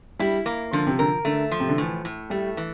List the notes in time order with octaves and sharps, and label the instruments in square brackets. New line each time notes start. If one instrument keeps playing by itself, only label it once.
[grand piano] G3 [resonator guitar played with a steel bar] E4
[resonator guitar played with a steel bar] A#3
[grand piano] D3 [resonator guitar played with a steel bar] F3
[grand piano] C3
[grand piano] D3 [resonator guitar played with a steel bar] A#4
[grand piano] D3 [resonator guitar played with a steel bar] A3
[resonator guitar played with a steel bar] F3
[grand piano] C3
D3
[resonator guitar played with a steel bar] A2 [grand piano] E3
[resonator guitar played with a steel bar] A2
[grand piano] G3 [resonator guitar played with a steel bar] A3
[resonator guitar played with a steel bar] E3